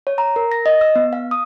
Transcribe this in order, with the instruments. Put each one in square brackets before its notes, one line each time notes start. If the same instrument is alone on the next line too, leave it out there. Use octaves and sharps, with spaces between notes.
[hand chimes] C#5
A#5
A#4
A#6
D#5
E6
B3
F5
D#6